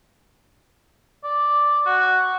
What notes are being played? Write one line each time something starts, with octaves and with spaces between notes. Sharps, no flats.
D5
F#4